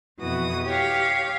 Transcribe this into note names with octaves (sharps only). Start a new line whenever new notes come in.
F2 B2 E3 F#4 D#6
G4 C#5 F5